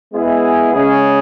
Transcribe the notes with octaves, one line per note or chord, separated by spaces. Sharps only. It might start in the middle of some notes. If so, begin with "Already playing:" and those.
G#3 B3 E4 G#4
C#3 G#3 C#4 G#4